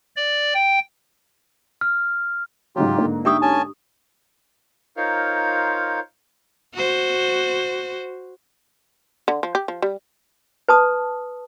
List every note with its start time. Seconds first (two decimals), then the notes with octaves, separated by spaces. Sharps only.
0.16 D5
0.54 G5
1.81 F6
2.76 G#2 C#3 F#3 F4 G4
2.98 G#2 D3 A#3
3.25 D4 G4 E5 G5 D#6
3.42 C#4 G#5 A5
4.97 D#4 F4 A#4 C5 C#5 F5
6.74 F#4 C5
9.28 D3
9.43 F3
9.55 G4
9.68 F3
9.82 G3
10.68 B4 A5 D#6